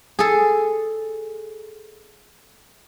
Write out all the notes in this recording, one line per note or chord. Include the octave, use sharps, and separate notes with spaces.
G#4 A4